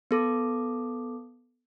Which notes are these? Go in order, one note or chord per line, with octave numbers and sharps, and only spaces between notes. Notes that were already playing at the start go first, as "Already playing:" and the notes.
B3 A4 D6